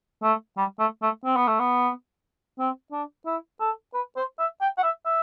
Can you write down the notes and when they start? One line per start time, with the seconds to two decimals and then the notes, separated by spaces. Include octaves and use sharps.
0.23 A3
0.57 G3
0.79 A3
1.02 A3
1.25 C4
1.36 B3
1.48 A3
1.60 B3
2.59 C4
2.92 D4
3.26 E4
3.60 A4
3.94 B4
4.17 C5
4.39 E5
4.61 G5
4.78 F#5
4.83 E5
5.05 E5